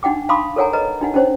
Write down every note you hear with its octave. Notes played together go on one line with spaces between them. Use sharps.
D4 D#4 F#5 G5 D6
F5 A5 B5 C6 D6 D#6
A4 A#4 C#5 F#5 G#5 A#5
B4 D#5 A#5
D4 D#4 F#5
C#4 D#4 C5 C#5